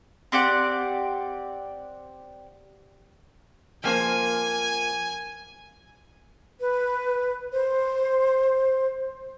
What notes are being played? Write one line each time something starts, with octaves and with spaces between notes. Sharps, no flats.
C4 G4 D5 F#5
F3 A#3 C5 G#5
B4
C5